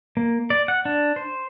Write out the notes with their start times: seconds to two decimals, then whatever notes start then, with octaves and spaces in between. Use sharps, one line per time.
0.17 A#3
0.50 D5
0.68 F#5
0.85 D4
1.16 C5